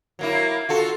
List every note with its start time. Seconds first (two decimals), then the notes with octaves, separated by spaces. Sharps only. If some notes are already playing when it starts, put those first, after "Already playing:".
0.19 F#3 A#3 E4
0.69 F4 F#4 A4